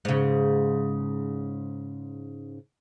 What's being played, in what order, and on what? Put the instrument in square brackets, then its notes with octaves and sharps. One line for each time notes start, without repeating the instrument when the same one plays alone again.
[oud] G#2 C#3